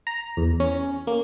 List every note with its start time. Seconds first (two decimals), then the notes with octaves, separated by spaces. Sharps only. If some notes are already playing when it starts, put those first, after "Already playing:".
0.07 A#5
0.37 E2
0.60 C#4
1.07 A#3